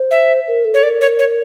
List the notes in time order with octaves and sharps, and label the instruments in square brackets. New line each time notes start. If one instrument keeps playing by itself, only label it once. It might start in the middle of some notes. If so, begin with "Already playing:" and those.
Already playing: [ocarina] C5
[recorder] E5
[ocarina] A#4
A4
[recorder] C#5
[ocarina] A#4 [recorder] D5
[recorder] C#5
C#5